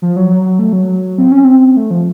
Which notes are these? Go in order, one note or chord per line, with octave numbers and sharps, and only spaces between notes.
F3
F#3
F#3
F#3
A3
F#3
C4
C#4
C4
A3
F3